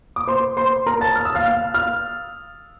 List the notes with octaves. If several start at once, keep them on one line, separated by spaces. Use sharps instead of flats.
D6
C5 C6
C5 C6
A#4 A#5
A5 A6
F6
E6
F5 F6
F5 F6
F5 F6